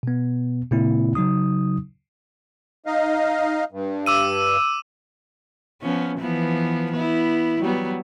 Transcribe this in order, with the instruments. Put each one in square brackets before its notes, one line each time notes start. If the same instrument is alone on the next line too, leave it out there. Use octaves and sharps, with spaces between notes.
[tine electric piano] B2 B3
A#2 C#3 G#3 A#3 C4 E4
C#3 F#3 D#4 D#6
[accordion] D#4 D#5 F5
G2
[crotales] D6 E6 D#7
[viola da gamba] F3 B3 C#4
E3 F3 B3
B3 E4
F#3 G3 B3